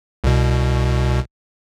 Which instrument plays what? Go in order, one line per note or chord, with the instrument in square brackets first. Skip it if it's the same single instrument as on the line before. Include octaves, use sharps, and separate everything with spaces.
[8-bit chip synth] C2 B2